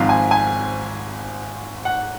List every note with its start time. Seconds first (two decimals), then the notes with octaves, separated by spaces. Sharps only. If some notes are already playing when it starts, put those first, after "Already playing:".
Already playing: G#1 G#2 F3 C4 F5
0.09 G#5
0.31 G#5
1.85 F#5